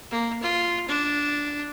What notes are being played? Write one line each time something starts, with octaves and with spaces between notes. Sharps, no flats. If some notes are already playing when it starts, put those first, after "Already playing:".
A#3
F4
D4